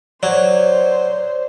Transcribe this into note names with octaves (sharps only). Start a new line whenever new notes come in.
F#3 C5 D5